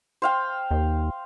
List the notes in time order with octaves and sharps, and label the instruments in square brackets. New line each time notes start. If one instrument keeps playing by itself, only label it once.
[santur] C5 F5 G5
[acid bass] D#2